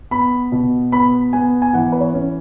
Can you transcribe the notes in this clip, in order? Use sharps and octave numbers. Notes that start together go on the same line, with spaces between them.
B3 B5
B2
B3 B5
B3 G#5
G#5
E3 F#5
B4
C#5
C#4